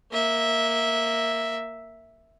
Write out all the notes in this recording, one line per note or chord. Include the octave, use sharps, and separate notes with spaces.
A#3 E5